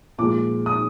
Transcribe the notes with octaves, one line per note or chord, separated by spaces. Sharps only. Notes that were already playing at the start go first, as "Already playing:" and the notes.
A#2 F3 G#3 D6
D#6